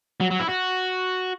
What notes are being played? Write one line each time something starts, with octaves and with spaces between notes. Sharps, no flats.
F#3
F#3
E4
F#4